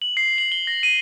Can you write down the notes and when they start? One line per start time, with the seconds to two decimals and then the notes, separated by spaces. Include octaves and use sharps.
0.02 F#7
0.17 C7
0.38 F#7
0.52 G7
0.67 A#6
0.83 D#7